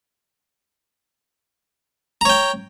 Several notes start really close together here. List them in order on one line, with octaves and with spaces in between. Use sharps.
A#5 C#5 G5